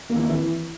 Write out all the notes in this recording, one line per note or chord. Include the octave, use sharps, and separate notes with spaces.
A#3
E3
A#3
E4
E3